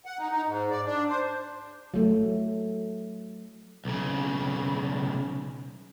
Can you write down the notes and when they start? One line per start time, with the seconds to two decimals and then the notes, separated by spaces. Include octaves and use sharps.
0.05 F#5
0.19 D#4
0.32 D#4
0.46 G#2
0.71 D5
0.85 D4
1.09 C5
1.94 F#3 A3
3.85 B1 C#3